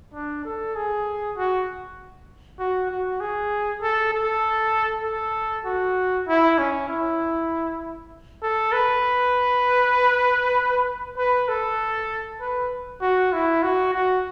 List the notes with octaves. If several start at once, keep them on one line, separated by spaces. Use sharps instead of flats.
D4
A4
G#4
F#4
F#4
F#4
G#4
A4
A4
A4
F#4
E4
C#4
E4
A4
B4
B4
A4
B4
F#4
E4
F#4
F#4